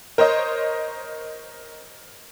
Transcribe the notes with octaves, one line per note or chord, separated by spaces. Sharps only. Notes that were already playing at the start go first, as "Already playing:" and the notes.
A#4 C5 C#5 D#5